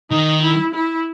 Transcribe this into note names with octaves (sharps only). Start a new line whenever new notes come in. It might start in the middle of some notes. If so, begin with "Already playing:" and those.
D#3 D#4
E4
E4